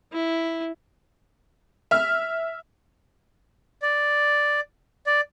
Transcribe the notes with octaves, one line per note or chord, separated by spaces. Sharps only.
E4
E5 F6
D5
D5